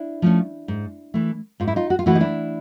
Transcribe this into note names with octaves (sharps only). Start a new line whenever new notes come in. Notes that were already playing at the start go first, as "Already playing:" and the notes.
Already playing: D4 E4
F3 A3 C#4
G#2
E3 A3
G#2 F4
E4
D#4 F4
F#4
F4
E3 A3 E4 F#4
D#4
D4 E4